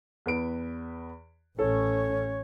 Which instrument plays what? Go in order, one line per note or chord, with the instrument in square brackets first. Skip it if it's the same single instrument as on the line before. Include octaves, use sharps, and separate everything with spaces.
[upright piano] E2 B4 D7
[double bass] A1 C#4 [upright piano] A4 [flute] C#5